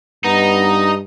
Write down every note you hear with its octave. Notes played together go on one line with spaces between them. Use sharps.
G2 B3 D#4 D#5 A#5 D#6